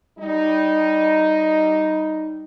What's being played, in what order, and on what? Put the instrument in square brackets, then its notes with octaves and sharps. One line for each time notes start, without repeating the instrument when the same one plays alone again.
[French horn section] G3 D#4